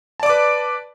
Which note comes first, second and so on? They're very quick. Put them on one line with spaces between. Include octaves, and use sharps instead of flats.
A5 D5 D6 B4